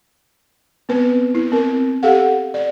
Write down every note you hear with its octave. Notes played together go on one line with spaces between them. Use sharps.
B3 C4 B4
E4
C4 A#4
G4 A4 F5 F#5
D5